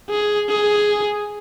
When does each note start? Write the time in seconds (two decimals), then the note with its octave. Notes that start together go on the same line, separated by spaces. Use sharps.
0.10 G#4
0.49 G#4